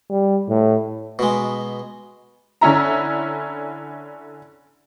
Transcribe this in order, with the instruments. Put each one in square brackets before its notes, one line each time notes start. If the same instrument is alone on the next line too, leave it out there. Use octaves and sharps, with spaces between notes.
[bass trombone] G3
A2
[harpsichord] B2 G#3
[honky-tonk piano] D3 C#4 E4 A#5